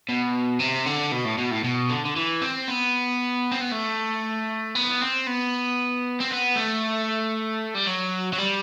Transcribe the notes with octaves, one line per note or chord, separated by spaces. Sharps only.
B2
C3
D3
B2
A2
B2
A2
B2
D3
D3
E3
C4
B3
C4
B3
A3
B3
C4
B3
C4
B3
A3
G3
F#3
F#3
G3